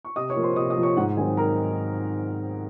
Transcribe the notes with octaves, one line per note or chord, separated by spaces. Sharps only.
C#6
C3 D#5 D#6
C#5 C#6
F3 A#3 F4
C5 C6
C#6
C3 D#5 D#6
D#5 D#6
F3 A#3 F4
C#5 C#6
G#2 F#5
D#3 F#3 C4 G#4 G#5
A#4 A#5